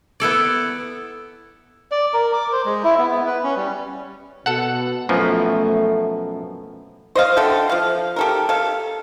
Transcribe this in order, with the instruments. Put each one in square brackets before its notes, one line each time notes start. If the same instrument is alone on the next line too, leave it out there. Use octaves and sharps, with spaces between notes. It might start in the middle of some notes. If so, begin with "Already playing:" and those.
[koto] B3 E4 A4 D5
[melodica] D5
A#4
D6
C5
G#3
E4
B3
B3
B4
C#4
G3
[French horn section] B2 [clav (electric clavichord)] A4 F#5
[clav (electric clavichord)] F#2 B2 F3 [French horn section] A3
[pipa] C5 D#5 F5
D3 A4 E5 G5
F3 F5
G4 A4 A#4
A4 F5